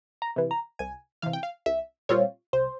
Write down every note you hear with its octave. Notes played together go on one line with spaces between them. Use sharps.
A#5
C3 E3
A#5
C2 G#5
C3 E3 F5
G5
F5
C2 E5
A#2 G3 C4 F4 C#5
C2 C5